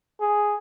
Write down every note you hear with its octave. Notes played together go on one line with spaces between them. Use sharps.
G#4